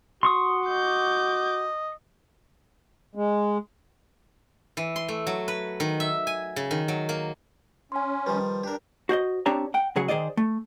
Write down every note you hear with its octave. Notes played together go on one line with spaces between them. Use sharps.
F#4 C6 C#6 D#6
D#5 D6 G6
G#3
E3
C6
A3
F#3
B4
D#3
E5
G#5
C#3
D#3
F#3
A#3
C#4 G#5 C6
D#3 F3 G3 B4
D4 G4 A#4
F#4 C5 D5 D#5
C4 D4 G4 C#5 A5 A#5
F#5 G5
C#3 F#3 G#4 F#5
D#3 G#4 C5 D5 D#5
A3